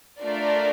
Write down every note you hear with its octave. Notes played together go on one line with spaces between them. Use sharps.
A3 D4 F4 A#4 D5